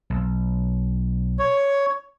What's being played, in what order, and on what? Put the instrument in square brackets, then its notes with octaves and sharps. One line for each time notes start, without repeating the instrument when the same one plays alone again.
[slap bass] B1
[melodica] C#5